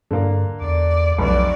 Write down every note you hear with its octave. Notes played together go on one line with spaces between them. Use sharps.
G2 D3 A#3
E2 D5
F1 B1 F#3 D5